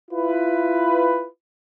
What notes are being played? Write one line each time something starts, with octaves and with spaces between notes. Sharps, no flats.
E4 F4 B4